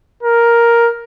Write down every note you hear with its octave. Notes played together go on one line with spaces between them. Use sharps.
A#4